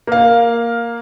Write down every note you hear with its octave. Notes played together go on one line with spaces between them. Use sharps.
A#3 F5